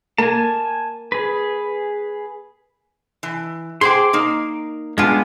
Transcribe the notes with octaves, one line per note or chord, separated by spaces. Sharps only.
A#3 G#5 A5
G#4 B4
E3
G#4 C5 G5 C6 D6
A#3 D#4
G#3 B3 D4 F4 G#5